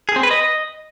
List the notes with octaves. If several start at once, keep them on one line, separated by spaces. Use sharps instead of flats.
G#4
C4
B4
D#5